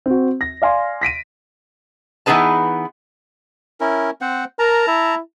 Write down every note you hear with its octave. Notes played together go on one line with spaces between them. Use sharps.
C4 F#4
A#6
D5 F5 G#5 C6
A#6 B6 D7 D#7
E3 B3 D#4 G#4 B4 A5
C#4 E4 A#4
C4 C5 F#5
A#4 A5 A#5
E4